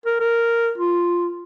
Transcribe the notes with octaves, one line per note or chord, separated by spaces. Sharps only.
A#4
A#4
F4